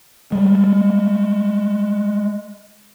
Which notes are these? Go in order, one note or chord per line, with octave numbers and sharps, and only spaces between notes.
G3 G#3